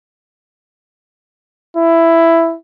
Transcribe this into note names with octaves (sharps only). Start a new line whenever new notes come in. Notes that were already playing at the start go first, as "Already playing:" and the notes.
E4